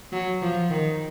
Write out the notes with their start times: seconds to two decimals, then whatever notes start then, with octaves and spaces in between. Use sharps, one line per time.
0.12 F#3
0.42 F3
0.70 D#3